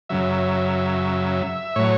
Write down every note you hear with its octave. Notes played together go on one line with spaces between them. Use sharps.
F#2 C#3 F#3 E5
A2 F#3 C#5